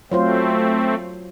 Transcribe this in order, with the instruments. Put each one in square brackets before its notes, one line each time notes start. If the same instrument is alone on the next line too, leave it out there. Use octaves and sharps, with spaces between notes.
[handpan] F#3 F4 C5 [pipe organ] A3 C4